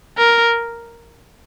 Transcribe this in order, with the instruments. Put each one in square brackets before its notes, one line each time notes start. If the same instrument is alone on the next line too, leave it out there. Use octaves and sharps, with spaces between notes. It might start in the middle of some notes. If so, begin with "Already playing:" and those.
[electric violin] A#4